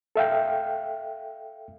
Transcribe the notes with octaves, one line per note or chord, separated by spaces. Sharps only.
A4 E5 F5 G5